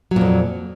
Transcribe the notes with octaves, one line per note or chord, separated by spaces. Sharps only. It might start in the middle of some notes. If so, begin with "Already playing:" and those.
F2 A#2 F#3